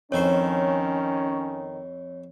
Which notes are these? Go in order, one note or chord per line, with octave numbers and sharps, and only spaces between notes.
F2 D#3 C#4 E4 C5 C#5